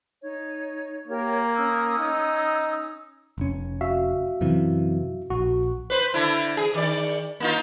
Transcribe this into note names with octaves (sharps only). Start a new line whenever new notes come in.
D#4 C#5
A#3 G4 A#4 C#5
C#4 D#6 E6
D#4
F1 C#4
F#4 E5 F5
F#2 C3 E3
A#1 F#4
B4 C5
D3 E4
G#4
D#3 D5
A#3 D#4 F4